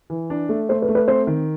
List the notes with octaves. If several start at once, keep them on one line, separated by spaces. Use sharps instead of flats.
E3
D4
A3
A3 C5
B4
A3
B4
C4 C5
D#3